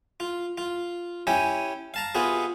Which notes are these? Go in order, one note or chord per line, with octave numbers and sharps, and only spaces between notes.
F4
F4
C#4 E4 G4 G5 G#5
F5 A5 A#5
C3 B3 F4 F#4 G#4